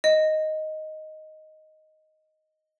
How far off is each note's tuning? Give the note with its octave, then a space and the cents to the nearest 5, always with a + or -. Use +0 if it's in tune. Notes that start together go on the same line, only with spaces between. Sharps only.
D#5 +0